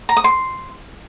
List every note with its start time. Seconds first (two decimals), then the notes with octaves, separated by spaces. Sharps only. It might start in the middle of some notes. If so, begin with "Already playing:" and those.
0.09 A#5
0.17 D#6
0.24 C6